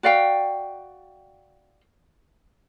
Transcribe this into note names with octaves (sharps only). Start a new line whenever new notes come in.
F#4 D5 F5 G5